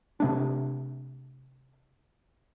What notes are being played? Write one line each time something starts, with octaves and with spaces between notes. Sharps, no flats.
C3 A3 D4